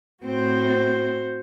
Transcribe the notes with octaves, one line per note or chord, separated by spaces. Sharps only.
A2 C4 F#4 C5